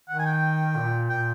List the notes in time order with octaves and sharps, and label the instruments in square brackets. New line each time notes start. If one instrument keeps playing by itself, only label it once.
[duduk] D#3 [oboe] F#5
[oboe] G#5
G5
[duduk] A#2
[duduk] A#2 [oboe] G5